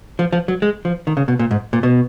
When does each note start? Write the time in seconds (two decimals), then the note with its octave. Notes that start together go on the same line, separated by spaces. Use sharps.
0.19 F3
0.32 F3
0.48 F#3
0.62 G#3
0.85 F3
1.07 D#3
1.17 C#3
1.28 B2
1.39 A#2
1.51 G#2
1.73 A#2
1.83 B2